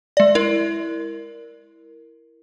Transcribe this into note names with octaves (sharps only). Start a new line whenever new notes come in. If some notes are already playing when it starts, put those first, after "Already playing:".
G#3 D5
E4 A#4